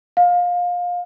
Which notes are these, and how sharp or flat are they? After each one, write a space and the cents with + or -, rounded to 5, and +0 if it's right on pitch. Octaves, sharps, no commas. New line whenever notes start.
F5 +25